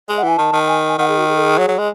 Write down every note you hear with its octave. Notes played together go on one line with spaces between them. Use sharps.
G#3 D#5
F#5
E3 G#5
D#3 A5
D#3
G#5
G#5
D#3 F#5
G#4
F#4
G#4
A4
G#4
F#3
F#3
G#3